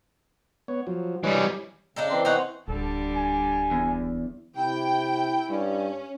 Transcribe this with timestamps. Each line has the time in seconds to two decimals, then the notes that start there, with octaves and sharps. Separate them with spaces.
0.68 B3 C#5
0.87 F3 F#3
1.24 E3 G3 C#5 D#5 G#5
1.96 C#3 D4 D#4 A4
2.10 E3 C4 C6
2.25 D#4 C#5 F#5
2.68 D1 D3 G3 A4
3.15 G#5
3.71 E2
4.56 C3 E4 G5
5.50 G2 C#4